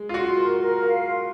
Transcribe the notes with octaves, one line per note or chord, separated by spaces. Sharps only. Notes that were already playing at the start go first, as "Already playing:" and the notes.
Already playing: G#3
F4
F#4 C6
A#4
A#4
F5
C6